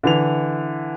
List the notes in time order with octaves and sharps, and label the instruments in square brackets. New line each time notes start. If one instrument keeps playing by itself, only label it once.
[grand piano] D3 E3 F7